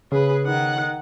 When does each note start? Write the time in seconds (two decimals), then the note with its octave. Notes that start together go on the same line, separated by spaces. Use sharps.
0.12 C#3 G#4 B4
0.45 D#3 F#5